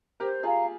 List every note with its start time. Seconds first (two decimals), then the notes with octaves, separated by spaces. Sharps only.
0.20 G4 A#4 C5
0.43 F4 G#4 F5 A#5